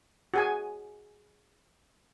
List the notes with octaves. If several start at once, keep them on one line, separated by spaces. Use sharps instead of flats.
F#4 G#4 G#5